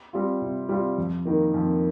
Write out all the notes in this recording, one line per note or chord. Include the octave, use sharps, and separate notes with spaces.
G3 C4 F4
C3
G3 C4 F4
F2
D#3 A#3
F2